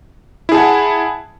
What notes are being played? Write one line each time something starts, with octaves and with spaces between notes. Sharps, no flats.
E4 G#4 F#5 A5